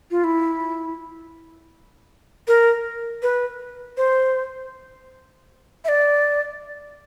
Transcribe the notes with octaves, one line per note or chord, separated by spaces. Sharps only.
F4
E4
A#4
B4
C5
E5
D5